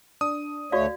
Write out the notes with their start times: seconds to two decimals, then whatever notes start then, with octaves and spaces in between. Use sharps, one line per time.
0.21 D4 D#6
0.72 D2 A3 F#4 C#5 D5 F5